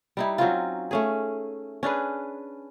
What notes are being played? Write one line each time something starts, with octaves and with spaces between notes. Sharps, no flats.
G3 D#4 E4
F#3 C4 C#4 F4
A3 C#4 G#4
C#4 D4 G#4 B4